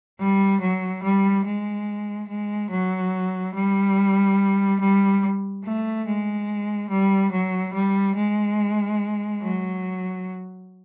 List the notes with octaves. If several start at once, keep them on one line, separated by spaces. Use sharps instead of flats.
G3
F#3
G3
G#3
G#3
F#3
G3
G3
A3
G#3
G3
F#3
G3
G#3
F#3